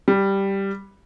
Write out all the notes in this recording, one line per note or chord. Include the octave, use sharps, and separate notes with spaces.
G3